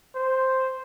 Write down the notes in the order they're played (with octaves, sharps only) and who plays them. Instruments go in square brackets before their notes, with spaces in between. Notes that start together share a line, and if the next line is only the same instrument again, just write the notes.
[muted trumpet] C5